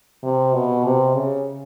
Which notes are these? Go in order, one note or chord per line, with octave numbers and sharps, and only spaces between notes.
C3
B2
C3
C#3